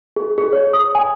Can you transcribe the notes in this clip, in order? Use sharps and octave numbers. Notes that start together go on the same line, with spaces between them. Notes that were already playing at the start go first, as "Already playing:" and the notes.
G#4
G#4
C#5
D#6
G#5